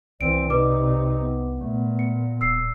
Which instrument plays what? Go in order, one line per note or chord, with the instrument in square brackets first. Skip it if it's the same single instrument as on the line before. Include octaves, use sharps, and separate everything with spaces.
[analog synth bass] C2 [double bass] E3 C4 [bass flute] D5 [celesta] D7
[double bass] C3 D#4 [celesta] B4 D6
[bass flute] B3
[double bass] A#2 [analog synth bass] A3
[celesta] C#7
[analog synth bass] D1 [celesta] E6 C7